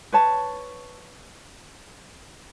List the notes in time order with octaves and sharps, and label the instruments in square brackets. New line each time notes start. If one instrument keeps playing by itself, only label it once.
[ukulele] B4 C#5 A5